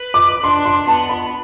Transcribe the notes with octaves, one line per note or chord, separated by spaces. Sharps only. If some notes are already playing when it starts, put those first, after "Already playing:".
Already playing: B4
D6
D4 C6
C6
B3 A5
B5